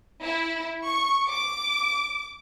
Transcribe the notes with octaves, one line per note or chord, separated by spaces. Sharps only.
E4
C#6
D6